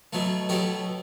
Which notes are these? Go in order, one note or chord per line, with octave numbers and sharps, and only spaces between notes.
B2 F#3 A3
B2 F#3 A3 G4